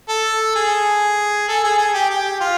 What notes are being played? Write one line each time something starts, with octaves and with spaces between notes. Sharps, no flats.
A4
G#4
A4
G#4
G#4
G4
G4
F4